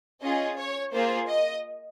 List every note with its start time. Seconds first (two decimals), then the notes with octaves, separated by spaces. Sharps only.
0.22 C#4 F4 G#4 D#5
0.58 C#5
0.93 A#3 F4 G#4 C5
1.28 D#5